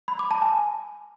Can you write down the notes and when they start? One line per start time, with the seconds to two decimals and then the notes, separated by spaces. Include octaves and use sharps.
0.08 B5
0.19 D6
0.31 A5
0.42 G#5